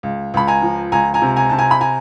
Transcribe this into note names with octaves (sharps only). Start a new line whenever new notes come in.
C#2
C#2 B5
G#5 A#5
F3
C#2 G#5 A#5
G#5 A#5
C3
G#5 A#5
C3 A5
G#5 A#5
B5
G#5 A#5